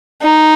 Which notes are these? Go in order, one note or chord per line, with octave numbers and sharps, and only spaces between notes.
D#4